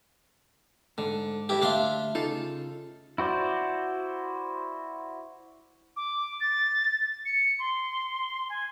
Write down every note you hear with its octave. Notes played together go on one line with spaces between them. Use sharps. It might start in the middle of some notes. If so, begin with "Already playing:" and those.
G#2 D3
G2 E4 G4
D2 D4 E5 F5 C6
C#3 D#4 F4 A4
E4 F#4 C5 D5
D6
A6
C#7
C6
G#5